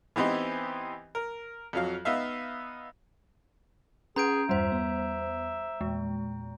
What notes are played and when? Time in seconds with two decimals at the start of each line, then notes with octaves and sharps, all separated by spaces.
0.16 E3 B3 C4 D#4 G4
1.15 A#4
1.73 F2 F#3 F5
2.05 B3 D#4 E5 F5
4.16 C#4 G#4 B4 F#5 A#5 G6 D7
4.49 E2 G2 G3 C5 E5 C6
4.72 E2 B3
5.81 E2 A#2 G#3